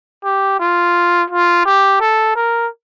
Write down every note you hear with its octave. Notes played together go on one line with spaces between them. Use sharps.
G4
F4
F4
G4
A4
A#4